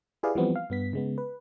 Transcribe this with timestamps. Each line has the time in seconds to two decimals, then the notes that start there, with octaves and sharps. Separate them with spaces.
0.23 E4 G4 G#4 B4 D5 F5
0.35 E3 F3 G3 B3 C4
0.56 F5
0.70 G2 B3 B6
0.93 C#3 G#3 B3
1.18 B4